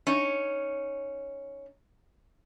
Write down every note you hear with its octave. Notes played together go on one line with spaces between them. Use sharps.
C#4 D#4